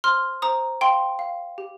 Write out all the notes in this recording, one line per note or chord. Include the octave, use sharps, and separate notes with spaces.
C5 C6 F6
C5 A#5 D#6
F5 G5 C6
F5
G4